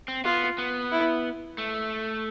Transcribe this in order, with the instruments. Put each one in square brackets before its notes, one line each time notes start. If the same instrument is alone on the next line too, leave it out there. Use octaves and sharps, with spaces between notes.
[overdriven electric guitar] C4
[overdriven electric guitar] B3 [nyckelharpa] F4
[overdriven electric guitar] B3
[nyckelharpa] E4
[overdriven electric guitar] A3